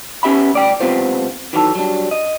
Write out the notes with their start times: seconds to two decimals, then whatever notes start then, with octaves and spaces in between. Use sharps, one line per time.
0.23 B3 C#4 G4 E5 F#5 B5
0.53 D2 D5 G5
0.80 C#2 F#2 C3 B3 F4 C5
1.53 D#3 E3 F#3 F#4 A4
1.75 F#3 G3 D4
2.11 D#5